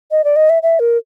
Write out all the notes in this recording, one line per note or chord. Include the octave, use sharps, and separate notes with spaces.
D#5
D5
D#5
E5
E5
A#4